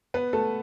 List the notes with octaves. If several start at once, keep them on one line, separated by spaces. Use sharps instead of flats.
B3 B4
A3 A4